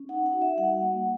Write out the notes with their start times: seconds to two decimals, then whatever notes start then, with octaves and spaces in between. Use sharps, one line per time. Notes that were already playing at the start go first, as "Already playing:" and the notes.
Already playing: C#4
0.09 D#4 F#5
0.26 F#5
0.33 F#4
0.42 E5
0.57 G3 F#5
0.82 A#3